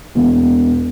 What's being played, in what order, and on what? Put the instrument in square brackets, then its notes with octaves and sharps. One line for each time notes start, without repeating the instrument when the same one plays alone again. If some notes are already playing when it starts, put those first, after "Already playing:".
[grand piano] E1 E2 B2